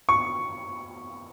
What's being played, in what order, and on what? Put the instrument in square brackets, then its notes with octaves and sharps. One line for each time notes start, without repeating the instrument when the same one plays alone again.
[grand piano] C#6